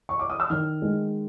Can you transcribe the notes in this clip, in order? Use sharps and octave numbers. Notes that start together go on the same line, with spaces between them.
C#6
D6
D#6
E6
D#3 F6
G#3